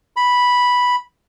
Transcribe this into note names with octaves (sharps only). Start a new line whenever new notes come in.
B5